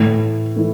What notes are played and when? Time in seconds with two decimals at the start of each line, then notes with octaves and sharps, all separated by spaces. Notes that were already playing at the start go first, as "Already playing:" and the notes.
Already playing: A2 E3 A3 E4
0.56 E3 A3 E4